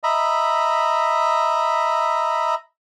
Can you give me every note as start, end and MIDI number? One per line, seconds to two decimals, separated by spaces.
0.03 2.55 75
0.03 2.55 76
0.03 2.55 82
0.03 2.55 83